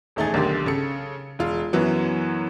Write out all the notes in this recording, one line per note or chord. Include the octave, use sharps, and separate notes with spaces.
D#1 E2 A3 D#4 G#4 A6
B1 D3 D#3 G4 C6
C#3 A4 C#7
E1 F4
F#2 E3 F#3 B3